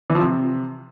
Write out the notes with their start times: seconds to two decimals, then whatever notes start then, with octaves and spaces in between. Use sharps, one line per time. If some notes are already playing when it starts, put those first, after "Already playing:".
0.10 E3
0.15 F3
0.20 C3